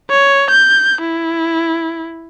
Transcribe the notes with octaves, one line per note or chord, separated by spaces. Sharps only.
C#5
G6
E4